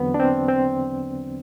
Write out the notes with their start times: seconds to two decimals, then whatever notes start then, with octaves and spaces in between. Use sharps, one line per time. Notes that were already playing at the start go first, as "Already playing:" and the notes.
Already playing: E2 D3 F#3 B3 C4
0.14 D4
0.20 C4
0.48 C4